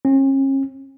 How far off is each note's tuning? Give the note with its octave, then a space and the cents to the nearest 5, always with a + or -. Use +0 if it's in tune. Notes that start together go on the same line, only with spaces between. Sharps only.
C#4 -40